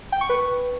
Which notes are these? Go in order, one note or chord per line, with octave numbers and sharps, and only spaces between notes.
G5
C#6
B4